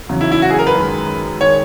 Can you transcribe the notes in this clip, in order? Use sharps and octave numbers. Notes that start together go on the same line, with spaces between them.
E2 C#3 F#3
E4
E4
F#4
G#4
A#4
B4
F#2 D#3 G#3
D#3 G#3 C#5